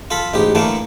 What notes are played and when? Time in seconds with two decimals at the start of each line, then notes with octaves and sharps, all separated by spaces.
0.11 F4 A4 B5
0.34 A1 G#2 G4
0.55 A2 D3 E3 A3 A#3